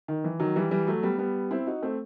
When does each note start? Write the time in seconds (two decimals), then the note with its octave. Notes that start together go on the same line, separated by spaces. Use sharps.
0.08 D#3
0.24 E3
0.40 D#3 F#3
0.56 E3 G3
0.71 E3 G3
0.87 F#3 A3
1.03 G3 B3
1.18 G3 B3
1.51 C4 E4
1.67 D#4 F#4
1.82 A3 C4